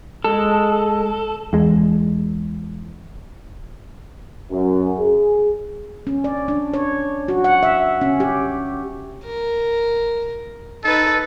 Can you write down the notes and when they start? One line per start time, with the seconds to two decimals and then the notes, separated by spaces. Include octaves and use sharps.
0.24 G#3 A4
1.53 E2 G#3
4.51 F#2
4.99 G#4
6.07 C#4
6.24 D5
6.48 D4
6.74 C#5
7.28 F#4
7.44 F#5
7.63 E5
8.01 C#4
8.20 G4
9.25 A#4
10.84 D#4 A4 B4